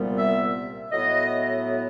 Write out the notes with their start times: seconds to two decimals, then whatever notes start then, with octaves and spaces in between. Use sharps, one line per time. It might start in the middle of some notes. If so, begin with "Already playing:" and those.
Already playing: C2 A#2 G3 B3
0.18 E5
0.91 A2 F#3 B3 E4 D#5